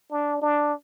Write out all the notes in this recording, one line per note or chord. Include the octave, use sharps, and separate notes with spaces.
D4
D4